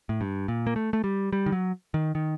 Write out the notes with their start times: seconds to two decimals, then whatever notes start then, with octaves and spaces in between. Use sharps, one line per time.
0.09 A2
0.21 G2
0.48 A#2
0.67 A#3
0.76 A3
0.93 A3
1.04 G3
1.33 G3
1.46 D#3
1.52 F#3
1.94 D#3
2.15 D#3